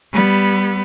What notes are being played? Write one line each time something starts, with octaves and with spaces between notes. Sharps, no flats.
G3 B3